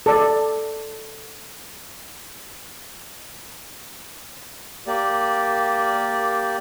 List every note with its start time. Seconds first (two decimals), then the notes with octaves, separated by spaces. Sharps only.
0.06 A4 D5
4.87 A#3 G4 D5